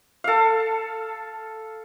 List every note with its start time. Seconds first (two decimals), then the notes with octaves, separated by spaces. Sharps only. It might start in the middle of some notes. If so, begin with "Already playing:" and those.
0.24 A4 F5